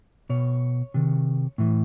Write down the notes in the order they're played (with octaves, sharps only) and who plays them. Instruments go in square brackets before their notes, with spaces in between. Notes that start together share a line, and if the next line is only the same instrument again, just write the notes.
[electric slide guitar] B2 C#5
C3 D#3
A2 E3